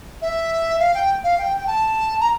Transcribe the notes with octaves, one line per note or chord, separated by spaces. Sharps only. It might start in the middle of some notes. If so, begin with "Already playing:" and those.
E5
F5
G5
F5
G5
G5
A5
A#5